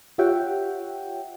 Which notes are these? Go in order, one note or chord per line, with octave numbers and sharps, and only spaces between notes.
F4 G4 C#5 E5 F#5 G5